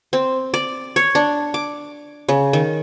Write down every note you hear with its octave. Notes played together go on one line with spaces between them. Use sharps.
C4
D5
C#5
D4
D6
C#3
D#3